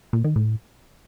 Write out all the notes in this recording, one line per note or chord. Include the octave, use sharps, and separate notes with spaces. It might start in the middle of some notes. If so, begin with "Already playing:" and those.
A#2
D#3
A2